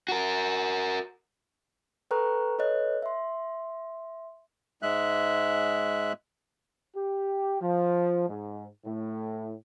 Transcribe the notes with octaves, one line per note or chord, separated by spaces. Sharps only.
F#4 A#4
A4 B4 G5 A#5 C#6 F#6
A4 B4 C#5 D#5 F#6
E5 C6
G#2 G#3 E5 F#6
G4
F3
G#2
A2